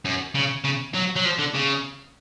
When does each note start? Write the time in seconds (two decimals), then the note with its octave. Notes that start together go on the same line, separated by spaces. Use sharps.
0.05 F#2
0.35 C#3
0.64 C#3
0.94 F#3
1.16 F#3
1.25 F3
1.39 D3
1.54 C#3